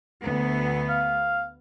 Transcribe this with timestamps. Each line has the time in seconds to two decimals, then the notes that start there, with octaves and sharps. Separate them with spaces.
0.24 D2 B3
0.89 F5